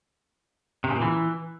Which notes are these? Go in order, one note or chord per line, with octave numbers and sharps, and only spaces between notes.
C3
C#3
A#2
E3